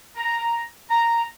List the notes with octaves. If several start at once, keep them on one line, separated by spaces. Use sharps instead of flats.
A#5
A#5